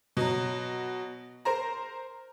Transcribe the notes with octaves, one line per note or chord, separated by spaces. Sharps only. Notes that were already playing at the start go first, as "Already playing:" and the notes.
B2 F#3
A#4 C5 A#5